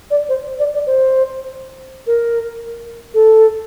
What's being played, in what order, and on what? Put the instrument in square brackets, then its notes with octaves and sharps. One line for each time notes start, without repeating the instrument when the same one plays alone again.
[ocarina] D5
C5
D5
D5
C5
A#4
A4